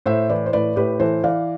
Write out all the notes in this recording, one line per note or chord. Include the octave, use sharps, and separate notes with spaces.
A2 C5 E5
E3 B4 D5
C5
A2 B4 D5
A2 G4 B4
E3 A4 C5
E3 D5 F5